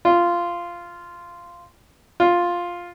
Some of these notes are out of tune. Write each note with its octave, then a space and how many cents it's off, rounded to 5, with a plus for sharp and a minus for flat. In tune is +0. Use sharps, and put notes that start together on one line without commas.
F4 -10
F4 +5